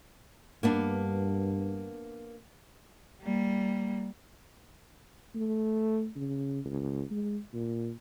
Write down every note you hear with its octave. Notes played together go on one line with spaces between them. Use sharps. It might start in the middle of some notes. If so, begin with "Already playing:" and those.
G2 A#3 B3 D4
G3 A#3
A3
C#3
C#2
G#3
A#2